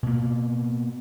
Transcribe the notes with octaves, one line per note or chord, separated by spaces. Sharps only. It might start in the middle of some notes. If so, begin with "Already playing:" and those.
B2 A#3